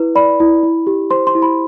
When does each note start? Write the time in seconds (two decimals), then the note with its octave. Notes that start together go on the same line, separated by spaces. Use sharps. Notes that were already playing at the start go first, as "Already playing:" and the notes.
Already playing: E4 B4
0.15 D5 B5
0.40 E4
0.63 E4
0.87 G4
1.11 C5 C6
1.27 C6
1.35 E4
1.42 B5